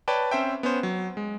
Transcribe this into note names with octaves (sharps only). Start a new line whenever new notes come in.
B4 C#5 D5 G5 A5
C4 C#4 C5 E5 G5
B3 C#4 C5
F#3
G#3